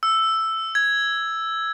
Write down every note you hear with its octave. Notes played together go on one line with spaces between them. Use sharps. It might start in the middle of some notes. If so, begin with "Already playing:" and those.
E6
G#6